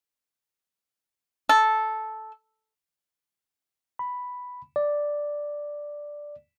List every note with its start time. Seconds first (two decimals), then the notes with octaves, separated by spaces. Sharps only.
1.49 A4
3.99 B5
4.76 D5